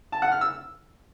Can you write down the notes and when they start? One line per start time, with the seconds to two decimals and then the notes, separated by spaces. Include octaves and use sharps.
0.12 A5
0.22 F#5
0.32 F6
0.41 E6